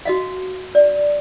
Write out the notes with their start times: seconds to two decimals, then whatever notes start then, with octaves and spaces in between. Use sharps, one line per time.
0.06 F#4 D#5 F5
0.75 D5